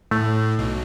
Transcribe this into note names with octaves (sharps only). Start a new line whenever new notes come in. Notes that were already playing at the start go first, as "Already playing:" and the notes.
A2 A3
B1 B2